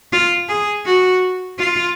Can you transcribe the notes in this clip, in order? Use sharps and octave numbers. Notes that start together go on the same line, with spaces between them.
F4
G#4
F#4
F4